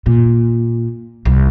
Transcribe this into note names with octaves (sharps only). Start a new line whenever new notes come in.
A#2
C2